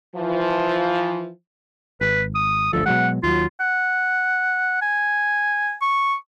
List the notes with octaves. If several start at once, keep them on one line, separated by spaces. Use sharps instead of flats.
E3 F3
G#1 B4
D#6
G1 D2 F3 A4
B2 F#3 G#3 F#5
D#2 F#3 F4
F#5
G#5
C#6